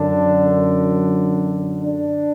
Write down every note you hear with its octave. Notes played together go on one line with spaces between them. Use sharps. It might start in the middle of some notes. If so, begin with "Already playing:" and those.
Already playing: F#2 D3 D4
D4